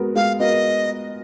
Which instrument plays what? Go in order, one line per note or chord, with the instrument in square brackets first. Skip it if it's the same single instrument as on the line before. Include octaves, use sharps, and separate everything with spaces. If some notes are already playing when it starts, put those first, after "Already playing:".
Already playing: [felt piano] G#3 B3 F#4 A#4
[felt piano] G#3 [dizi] F5
[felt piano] B3 F#4 A#4 [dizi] D#5